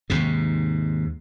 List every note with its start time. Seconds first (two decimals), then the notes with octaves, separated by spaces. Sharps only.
0.10 D#2 G#2 C3